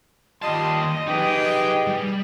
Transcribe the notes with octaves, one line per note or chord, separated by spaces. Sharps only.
D#2 G3 F4 D#5 A5 C6
D#4 G4 G#4 B4 G5
G3